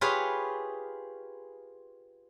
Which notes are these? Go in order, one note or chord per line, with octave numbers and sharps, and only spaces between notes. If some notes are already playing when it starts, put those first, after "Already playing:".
F4 G4 G#4 B4 C#5